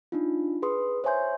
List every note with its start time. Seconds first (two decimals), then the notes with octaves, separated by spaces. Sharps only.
0.12 D4 D#4 F4
0.62 G#4 B4 C6 D#6
1.04 C5 C#5 E5 G#5 C6 G6